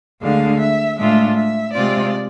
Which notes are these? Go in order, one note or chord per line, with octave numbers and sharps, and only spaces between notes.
D2 D3 G#3 D4 F5
E5
A2 G#3 D4 F4 E5
E5
C3 G#3 C4 F4 D5